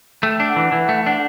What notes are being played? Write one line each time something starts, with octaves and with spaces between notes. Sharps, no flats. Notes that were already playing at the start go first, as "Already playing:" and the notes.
A3 G5
D4
F#5
E3
E3
A3
D4